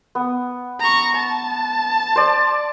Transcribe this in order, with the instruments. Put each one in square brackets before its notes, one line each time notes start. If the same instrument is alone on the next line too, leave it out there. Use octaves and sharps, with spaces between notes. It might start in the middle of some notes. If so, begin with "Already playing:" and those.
[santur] B3
[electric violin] A#5 C#6
A5
[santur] C5 D5